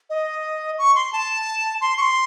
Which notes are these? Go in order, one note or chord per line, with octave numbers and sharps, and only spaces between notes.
D#5
C#6
C6
A5
C6
C#6
C6